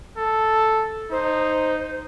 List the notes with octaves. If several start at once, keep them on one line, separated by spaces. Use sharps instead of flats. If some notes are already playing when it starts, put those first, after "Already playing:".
A4
D#4 C5